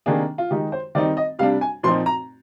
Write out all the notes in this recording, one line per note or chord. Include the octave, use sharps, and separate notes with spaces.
C3 D#3 A#3 D4 G#4
F4
D#3 G#3 D#4 G4
C5
D#3 G3 C4 D#4 D5
D#5
C3 G3 D4 F5
G#5
A#2 F3 C4 D#4 C6
A#5